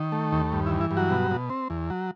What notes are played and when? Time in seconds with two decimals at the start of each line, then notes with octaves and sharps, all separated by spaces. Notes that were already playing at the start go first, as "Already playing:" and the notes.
Already playing: D#3
0.12 A3
0.32 D#2
0.52 G2
0.66 E4
0.72 E3
0.81 E4
0.91 G2
0.97 F#3 F#4
1.10 B2
1.31 B2
1.50 C4
1.70 E2
1.90 F#3